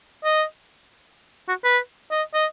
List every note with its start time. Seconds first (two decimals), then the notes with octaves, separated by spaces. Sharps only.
0.24 D#5
1.48 F#4
1.64 B4
2.11 D#5
2.34 D#5